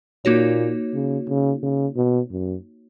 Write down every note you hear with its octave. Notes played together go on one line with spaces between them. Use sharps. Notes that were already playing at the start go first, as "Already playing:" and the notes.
A#2 A#3 D#4 F#4 C#5
C#3
C#3
C#3
B2
F#2